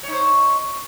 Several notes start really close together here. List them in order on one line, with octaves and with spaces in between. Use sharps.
C#5 D#4 C5